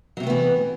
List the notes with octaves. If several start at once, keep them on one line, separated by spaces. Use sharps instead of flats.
C3 E3 F#3 A3 B3